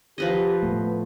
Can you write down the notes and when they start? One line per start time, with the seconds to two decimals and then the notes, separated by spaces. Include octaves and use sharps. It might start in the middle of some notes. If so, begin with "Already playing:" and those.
0.18 F3 G4 B4 D#5
0.63 A2 A3 B3